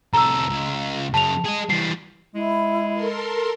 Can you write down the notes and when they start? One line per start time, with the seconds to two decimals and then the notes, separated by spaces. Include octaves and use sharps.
0.13 C2 A4 A#5 E6
0.50 C#2
1.14 F#2 C#3 A5 F7
1.45 G#4 D#5
1.70 E3 G3 C7
2.35 G#3 E4
2.94 A4 A#4 C6